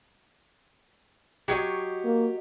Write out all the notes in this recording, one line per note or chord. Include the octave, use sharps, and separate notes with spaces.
F#3 G4 C#5 D#5
A#3